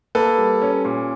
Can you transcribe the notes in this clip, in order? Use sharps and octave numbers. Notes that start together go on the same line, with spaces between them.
A#3 A4 B4
G3
C#4
A#2